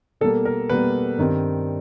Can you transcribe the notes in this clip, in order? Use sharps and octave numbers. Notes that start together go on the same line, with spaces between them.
B2 G3 A#3 A4
A#4
B2 G3 A#3 B4
G2 D#3 G3 C4